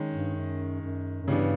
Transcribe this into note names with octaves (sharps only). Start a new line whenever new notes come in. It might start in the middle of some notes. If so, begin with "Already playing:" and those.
Already playing: D#3 G#3 C#4
G2
F#2
F#2
F#2
G2 C#3 E3 G3 B3 D4